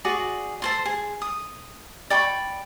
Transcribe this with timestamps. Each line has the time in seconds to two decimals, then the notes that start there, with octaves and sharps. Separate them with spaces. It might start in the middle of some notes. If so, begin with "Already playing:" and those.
0.05 F#4 G#4 D5
0.62 A4 C5 C6
0.85 G#4
1.22 D#6
2.10 D5 G5 B5 C#6